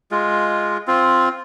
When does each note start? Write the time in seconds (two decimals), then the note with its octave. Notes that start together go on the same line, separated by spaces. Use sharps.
0.11 G#3 F4
0.87 C4 F4